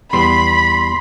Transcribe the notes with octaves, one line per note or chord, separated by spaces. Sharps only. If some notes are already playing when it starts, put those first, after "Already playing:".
E2 G3 B3 B5 C6